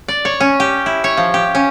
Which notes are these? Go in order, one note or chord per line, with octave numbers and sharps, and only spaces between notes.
D5
C#5
C#4
G4
E4
C#5
F3
G4
C#4